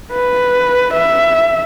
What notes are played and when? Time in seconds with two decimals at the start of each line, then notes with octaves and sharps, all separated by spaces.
0.12 B4
0.94 E5